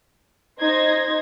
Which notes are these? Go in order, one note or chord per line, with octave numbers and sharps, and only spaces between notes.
D#4 C5 C6 G#6 A#6